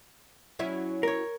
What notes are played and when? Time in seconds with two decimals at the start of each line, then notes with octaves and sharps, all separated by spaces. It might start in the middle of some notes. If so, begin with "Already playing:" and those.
0.59 F#3 C#4 E4
1.03 A#4 C#5